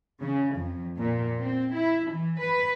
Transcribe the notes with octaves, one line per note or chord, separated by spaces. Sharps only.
C#3
F2
A#2
C4
E4
E3
B4